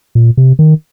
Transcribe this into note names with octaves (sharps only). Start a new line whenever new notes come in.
A#2
C3
D#3